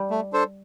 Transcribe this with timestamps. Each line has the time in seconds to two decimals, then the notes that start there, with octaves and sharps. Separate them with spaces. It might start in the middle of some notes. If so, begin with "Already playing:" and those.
Already playing: G3
0.10 A3
0.33 D4 A4 C5